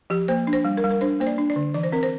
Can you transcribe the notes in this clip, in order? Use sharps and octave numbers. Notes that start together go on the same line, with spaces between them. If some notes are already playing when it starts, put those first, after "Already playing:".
F3 G4
A#3 C5
D4
C5
G3
A#4
G3
A#4
D4 C5
A#3 C5
D5
D4
D5
D3
E3 D5
C5
C4 A#4
C5